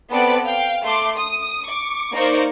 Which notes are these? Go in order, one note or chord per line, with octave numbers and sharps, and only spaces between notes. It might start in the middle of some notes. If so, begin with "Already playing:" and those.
B3 C4 A4 B4 D5 D7
F5 G5
A3 C6 D6
D#6
C#6 D6
A#3 D#4 A#4 C5 D5 C#6